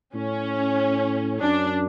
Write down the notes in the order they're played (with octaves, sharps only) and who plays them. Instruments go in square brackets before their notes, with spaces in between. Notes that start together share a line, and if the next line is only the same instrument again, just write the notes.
[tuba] A2 [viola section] C#4
[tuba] F#2 [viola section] D4